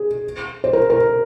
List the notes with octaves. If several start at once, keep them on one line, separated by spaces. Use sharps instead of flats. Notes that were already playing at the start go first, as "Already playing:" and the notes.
Already playing: G#4
C5
A#4
A#4